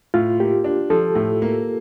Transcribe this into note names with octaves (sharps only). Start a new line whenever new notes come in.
A2 F4
A#3 G4
D4
F3 A4
A2
A#3